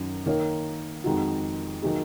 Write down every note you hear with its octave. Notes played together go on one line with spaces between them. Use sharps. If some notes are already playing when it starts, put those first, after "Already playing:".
Already playing: F#2 D#3 F#3
D#3 A#3 D#4 A#4 C#5
F2 D#3 G#3 D#4 F#4
D#3 F#3 A#3 D#4 G#4